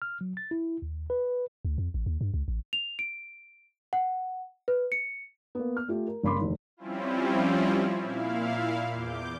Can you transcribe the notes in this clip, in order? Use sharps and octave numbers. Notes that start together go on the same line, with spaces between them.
F6
F#3
A6
E4
D#2
B4
D2
F2
A1
D#2
G2
C#2
A1
F7
D7
F#5
B4
C#7
A#3 B3
F6
A3 F4 G4
A#4
G1 C#3 A#3 B5 C6 D6
F1 D#3
F3 G3 C4 C#4 E4 F4
A#2 E4 F5
E2 D6 G6